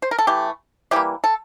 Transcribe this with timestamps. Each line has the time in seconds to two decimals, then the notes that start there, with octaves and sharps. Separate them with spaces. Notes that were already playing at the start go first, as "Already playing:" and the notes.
0.02 C5
0.11 A#4
0.18 A4
0.27 E3 A3 G4
0.91 E3 G3 A#3 G4
1.24 A4